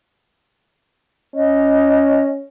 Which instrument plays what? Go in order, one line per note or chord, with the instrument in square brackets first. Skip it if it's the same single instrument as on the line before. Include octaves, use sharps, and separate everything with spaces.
[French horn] C#4 [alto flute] D#5